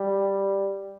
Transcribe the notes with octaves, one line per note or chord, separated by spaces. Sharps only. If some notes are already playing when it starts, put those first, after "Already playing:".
Already playing: G3